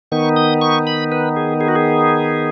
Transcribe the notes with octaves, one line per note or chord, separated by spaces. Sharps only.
D#3 B3 D#4 C#6
D#6
C#6
B5
B4
G#4
G#4
F#4
G#4